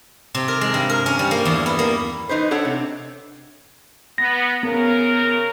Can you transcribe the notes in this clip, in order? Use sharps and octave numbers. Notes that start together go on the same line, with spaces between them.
C3
A#4
G#3
G2
A#4
C#4
G3
A#3
E2
B3
A#3
E3 D#4 B4 C5
D4 A4 C#5 F#5
C3
B3 A#6
C#3 B3 A#4